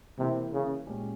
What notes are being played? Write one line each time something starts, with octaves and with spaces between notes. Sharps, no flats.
C3 E3 A#3 E4
C#3
A#2 G#3 C#4 G4